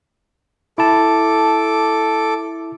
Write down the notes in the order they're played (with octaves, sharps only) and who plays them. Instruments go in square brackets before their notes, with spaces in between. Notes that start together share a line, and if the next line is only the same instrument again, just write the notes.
[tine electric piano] E4 A5 [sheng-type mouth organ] A4 D6